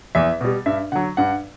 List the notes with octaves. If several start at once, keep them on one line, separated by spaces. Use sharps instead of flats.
E2 E5
B2 G3
G2 E5
D3 F#3 F#5
G2 F#5